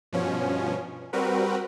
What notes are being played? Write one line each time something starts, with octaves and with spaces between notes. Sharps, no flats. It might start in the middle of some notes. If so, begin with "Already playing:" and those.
G2 B2 F3 C#4
G3 C4 F#4 A#4 B4